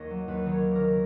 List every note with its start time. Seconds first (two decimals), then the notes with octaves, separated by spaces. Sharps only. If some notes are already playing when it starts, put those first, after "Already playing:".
Already playing: D#2 A#3 C#5 D#5
0.10 F#3
0.28 D#2 B4
0.46 D#3
0.51 C#5
0.63 A#3
0.75 A#4
0.81 D#3